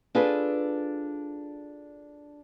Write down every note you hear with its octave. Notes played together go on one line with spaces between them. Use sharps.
D4 F4 G#4 A4 B4